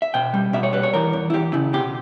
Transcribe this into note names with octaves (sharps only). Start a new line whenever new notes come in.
E5
B2 G5
G3
B2 E5
C#5
G3 B4
C#5
E3 A#4
E2
E4
E2 G4
C#3 E4
B2 G4